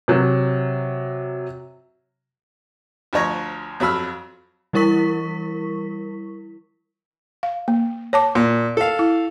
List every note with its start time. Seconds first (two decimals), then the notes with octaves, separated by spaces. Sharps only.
0.08 C3 F#3
3.13 D2 F3 C#5 A#5
3.80 F2 F#3 B5 E6 F6
4.73 E3 G3 E4 A#4 C#6 B6
7.43 F5
7.68 A#3
8.13 C#5 A5 D6
8.35 A#2
8.77 A4 F5
8.99 E4